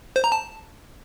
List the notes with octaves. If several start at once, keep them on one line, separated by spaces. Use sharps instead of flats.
C5
A#5
A5